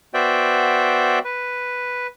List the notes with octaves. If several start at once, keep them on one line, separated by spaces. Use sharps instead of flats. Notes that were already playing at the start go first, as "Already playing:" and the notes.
B3 F#4 C5 D5 E5 G5
B4